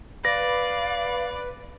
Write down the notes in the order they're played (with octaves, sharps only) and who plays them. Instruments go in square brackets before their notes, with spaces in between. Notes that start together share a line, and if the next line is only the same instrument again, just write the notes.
[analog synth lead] B4 [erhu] D5 [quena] F5 [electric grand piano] A#6